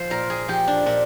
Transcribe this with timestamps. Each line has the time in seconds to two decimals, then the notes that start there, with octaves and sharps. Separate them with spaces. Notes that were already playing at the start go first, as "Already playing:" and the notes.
Already playing: F3 C5
0.10 A#2 A#4
0.30 G#4
0.48 F3 G4
0.68 D4
0.86 A#2 D4